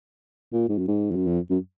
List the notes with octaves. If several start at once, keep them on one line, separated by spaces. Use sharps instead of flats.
A#2
G#2
F#2
G#2
F2
F#2
F2
F#2